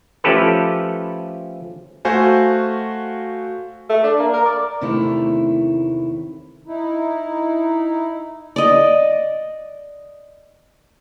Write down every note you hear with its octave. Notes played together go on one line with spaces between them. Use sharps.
F3 A3 C#4 G4 A4 B4
A3 F#4 C5 F5 G#5
A3
D4
A#3
A#4
D5
E2 C3 D#3 A3 E4 C#5
D#4 E4
D5 D#5